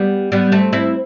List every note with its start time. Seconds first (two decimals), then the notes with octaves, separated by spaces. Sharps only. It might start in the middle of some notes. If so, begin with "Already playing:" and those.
Already playing: G3 B3
0.32 G3 B3
0.52 A3 C4
0.73 C4 E4